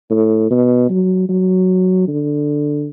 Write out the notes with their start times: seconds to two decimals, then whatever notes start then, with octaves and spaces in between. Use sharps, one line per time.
0.10 A2
0.50 B2
0.89 F#3
1.29 F#3
2.08 D3